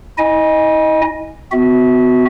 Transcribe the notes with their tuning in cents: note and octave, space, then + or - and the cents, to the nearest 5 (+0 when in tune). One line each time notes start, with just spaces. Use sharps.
E4 -45 D#5 +0 G#5 -15
B3 +35 F#4 +0 E5 -25